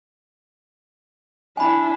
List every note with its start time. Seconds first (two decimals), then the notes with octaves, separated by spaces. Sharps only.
1.57 D4 E4 G#5 B5